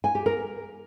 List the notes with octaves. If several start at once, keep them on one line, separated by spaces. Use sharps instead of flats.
G#5
G4
A#4